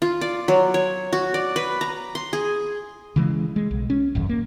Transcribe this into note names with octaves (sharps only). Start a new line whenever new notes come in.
F4
D5
F#3
C#5
F#4
D5
B4
A#5
C6
G#4
C#3 E3 G#3
G#3
B1
C#4
D1 G#1 F#2
A#3